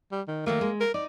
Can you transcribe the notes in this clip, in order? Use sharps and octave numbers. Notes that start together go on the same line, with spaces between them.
G3
D#3
D#3 F#3 A3 A#3
G#3
A#4
D#4 D5